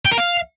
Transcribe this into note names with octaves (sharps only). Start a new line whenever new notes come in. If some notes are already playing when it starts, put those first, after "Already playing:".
G5
A#4
F5